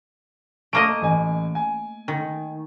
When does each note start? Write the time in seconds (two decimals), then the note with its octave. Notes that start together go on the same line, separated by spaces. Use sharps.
0.73 A3 A#3 D#5 D7
1.02 A1 G#5
1.55 G#5
2.08 D#3